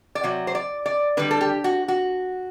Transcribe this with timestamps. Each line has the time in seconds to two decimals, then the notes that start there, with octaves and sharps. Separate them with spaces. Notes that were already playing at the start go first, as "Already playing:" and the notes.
0.15 D5
0.24 C3 F#3
0.47 C5
0.55 D5
0.86 D5
1.17 D3 G3 B4
1.31 A4
1.41 G4
1.64 F#4
1.88 F#4